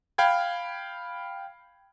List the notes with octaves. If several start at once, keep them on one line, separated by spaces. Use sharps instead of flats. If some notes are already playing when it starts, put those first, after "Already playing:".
F5 G5 B5 G#6